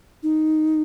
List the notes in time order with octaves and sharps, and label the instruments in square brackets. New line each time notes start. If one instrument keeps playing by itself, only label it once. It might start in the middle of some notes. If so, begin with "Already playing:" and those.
[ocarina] D#4